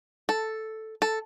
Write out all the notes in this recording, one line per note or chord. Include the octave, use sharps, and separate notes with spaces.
A4
A4